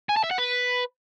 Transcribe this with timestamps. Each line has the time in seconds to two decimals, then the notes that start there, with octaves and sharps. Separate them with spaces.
0.09 G#5
0.17 A5
0.24 E5
0.31 F#5
0.38 B4